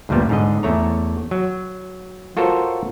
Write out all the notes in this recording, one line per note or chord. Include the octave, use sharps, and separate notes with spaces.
D2 G2 A#2 G3 B3
G#2 D3 D#5
E2 A3 C#5 A#5
F#3
F4 F#4 A4 A#4 C5 C#5